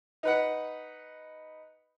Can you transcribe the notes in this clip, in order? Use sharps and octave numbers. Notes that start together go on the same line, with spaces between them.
D#4 B4 F#5